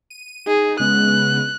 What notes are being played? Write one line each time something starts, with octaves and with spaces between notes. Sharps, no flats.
D#7
D#4 G#4
C#3 G#3 B3 F#6